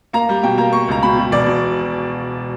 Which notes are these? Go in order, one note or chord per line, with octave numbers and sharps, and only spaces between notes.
A#3 A#5
G3
B2 G5
A#3 A#5
A#3 C#6
C#2 A#5
B2 B5
B2
E1 D5
B2